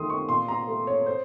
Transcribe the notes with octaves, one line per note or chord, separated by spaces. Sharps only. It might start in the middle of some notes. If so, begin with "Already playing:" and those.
Already playing: D#2 D#3 A3 C6 D#6
C#6
A#2 C6
A#5
A3
C#5
C5